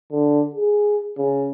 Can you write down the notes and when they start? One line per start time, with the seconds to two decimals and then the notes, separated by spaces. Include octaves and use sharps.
0.11 D3
0.55 G#4
1.18 C#3